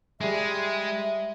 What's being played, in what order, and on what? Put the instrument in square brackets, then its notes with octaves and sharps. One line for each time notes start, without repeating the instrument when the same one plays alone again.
[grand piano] G3 G#4 [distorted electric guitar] G#3 [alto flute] E5